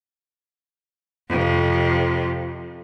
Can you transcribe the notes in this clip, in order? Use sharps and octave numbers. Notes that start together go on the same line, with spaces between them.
F2 C3